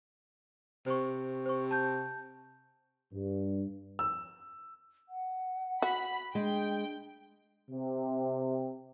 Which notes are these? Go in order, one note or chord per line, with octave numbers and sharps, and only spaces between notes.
C3 C5 C#6
C5 C#6
A5 G6
G2
E6
F#5
F#4 B5
G#3 D4 G5
C3